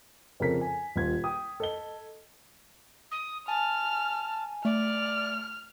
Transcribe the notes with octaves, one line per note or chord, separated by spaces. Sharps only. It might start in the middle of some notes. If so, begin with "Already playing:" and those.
F2 C#3 A4 A#4 B6
G#5
D#1 F4 G#6
G5 D#6
A4 D#5 G7
D#6
G#5 A5 F6
A3 D5 F6